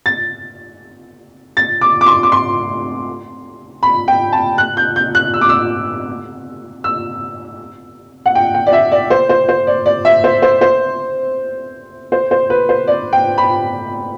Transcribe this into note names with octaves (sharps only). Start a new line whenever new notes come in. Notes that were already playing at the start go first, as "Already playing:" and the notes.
A6
A6
D6
D6
C6
D6
C6
B5
G5
A5
F#6
G6
G6
F#6
E6
D6
E6
E6
F#5
G5
G5
D5
E5
D5
C5
C5
C5
D5
D5
E5
C5
C5
C5
C5
C5
B4
C5
D5
G5
B5